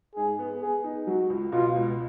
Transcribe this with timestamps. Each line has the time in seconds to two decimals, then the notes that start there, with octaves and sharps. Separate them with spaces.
0.16 G#2 G#4
0.39 B3
0.61 B3 G#4
0.84 D#4
1.07 F#3 F#4
1.30 C#2
1.52 B2 F4
1.76 C#2